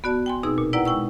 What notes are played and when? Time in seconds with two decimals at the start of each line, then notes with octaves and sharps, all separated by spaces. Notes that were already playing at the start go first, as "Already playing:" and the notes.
0.04 B3 F#4 D5 A5
0.26 G5 G#5 C6
0.43 B2 C4 D#4 G#4 D#6 E6
0.58 A#2
0.73 E4 B4 D5 F#5 G5 A#5
0.85 G#3 D#4 G5 C#6 E6